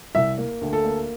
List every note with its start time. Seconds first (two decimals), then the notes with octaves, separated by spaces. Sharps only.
0.15 C2 E5
0.38 A#3
0.62 D2
0.73 A4
0.85 A#3